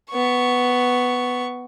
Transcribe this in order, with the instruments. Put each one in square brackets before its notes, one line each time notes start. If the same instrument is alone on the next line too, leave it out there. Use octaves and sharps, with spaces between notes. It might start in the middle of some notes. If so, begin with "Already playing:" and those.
[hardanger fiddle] B3 C#6